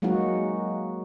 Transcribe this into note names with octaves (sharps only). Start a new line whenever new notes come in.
F#3 G#3 A#3 D#4 F#4